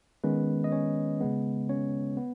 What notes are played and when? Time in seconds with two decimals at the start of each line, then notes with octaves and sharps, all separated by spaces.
0.24 D#3 G#3 B3 C#4 B4
0.64 D#5
0.72 C#4 C#5
1.21 C#3 G#3 B3
1.69 C#4 C#5
2.17 B3